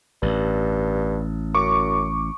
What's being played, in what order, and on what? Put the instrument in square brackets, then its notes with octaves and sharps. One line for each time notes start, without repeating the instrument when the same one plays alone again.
[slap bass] A1 [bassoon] G2
[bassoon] F#2 [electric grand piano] C#6 D6